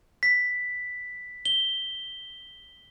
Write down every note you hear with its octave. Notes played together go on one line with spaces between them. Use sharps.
B6
G7